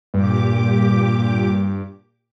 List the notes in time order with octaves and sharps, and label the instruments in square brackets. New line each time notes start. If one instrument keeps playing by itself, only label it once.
[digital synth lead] G2 [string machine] A#2 G4 D6